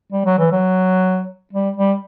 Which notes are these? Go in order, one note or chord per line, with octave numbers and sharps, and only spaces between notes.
G3
F#3
E3
F#3
G3
G3